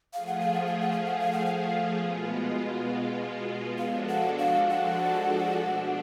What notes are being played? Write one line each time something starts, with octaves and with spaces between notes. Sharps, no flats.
F3 A3 F4 G#4 F5
F#5
F5
F#5
F5
F#5
F5
F#5
F5
F#5
F#5
F5
B2 G#3 B3 F4
F3 G#3 D4 F#4 A4 F5
F#5
F5
F#5
B2 A3 D4